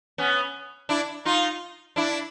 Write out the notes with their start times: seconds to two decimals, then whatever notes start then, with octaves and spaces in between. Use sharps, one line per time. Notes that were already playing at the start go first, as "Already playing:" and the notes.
0.18 B3 C#4
0.89 D4 E4
1.25 D#4 F4
1.96 D4 E4